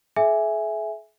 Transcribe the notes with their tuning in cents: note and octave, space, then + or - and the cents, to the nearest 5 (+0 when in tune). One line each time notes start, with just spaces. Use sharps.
G#4 +45 E5 +0 G#5 +0